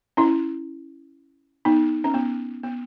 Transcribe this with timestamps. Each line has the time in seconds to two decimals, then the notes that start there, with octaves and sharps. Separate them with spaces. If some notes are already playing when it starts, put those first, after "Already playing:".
0.17 C#4 E4
1.65 B3 D#4
2.04 C#4
2.14 B3
2.63 B3